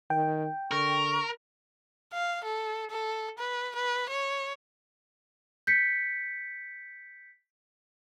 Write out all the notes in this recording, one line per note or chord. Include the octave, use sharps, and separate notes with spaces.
D#3 G5
D3 A#4 C#6
F5
A4
A4
B4
B4
C#5
G6 B6 C#7